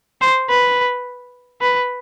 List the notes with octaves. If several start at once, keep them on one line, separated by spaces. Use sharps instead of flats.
C5
B4
B4